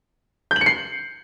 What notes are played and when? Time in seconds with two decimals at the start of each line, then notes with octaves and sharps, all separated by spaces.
0.51 G6
0.56 F#7
0.61 C#7
0.66 C7